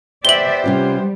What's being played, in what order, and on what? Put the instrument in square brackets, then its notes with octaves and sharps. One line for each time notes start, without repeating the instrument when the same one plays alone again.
[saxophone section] B3 G4 C5 [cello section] D5 E5 [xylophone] F#7 G7
[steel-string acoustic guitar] C3 C#4 F4 [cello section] G3